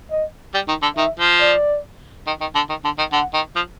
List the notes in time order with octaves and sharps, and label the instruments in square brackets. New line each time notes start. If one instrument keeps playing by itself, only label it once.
[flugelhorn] D#5
[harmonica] G3
D#3
D3
[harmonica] D#3 [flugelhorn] E5
[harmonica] F3
[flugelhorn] D5
[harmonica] D#3
D#3
D3
D#3
D3
D#3
[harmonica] D3 [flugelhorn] F#5
[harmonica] D#3
F3